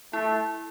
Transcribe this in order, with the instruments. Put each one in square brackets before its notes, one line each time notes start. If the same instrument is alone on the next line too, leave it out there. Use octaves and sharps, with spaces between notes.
[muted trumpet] A3 [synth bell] E4